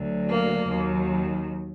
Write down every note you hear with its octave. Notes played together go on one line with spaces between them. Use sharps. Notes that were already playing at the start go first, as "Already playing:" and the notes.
Already playing: D2 D3 F#3
A#3
D#2 D#3 F#3